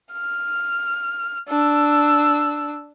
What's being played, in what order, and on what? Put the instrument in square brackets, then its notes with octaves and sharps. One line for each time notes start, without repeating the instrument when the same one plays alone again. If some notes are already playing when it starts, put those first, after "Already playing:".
[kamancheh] F6
D4 E6